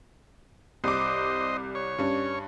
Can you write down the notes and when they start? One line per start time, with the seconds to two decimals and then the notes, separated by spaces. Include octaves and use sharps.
0.84 C2 C5 D#5 D6
1.75 C#5
1.98 G2 C#4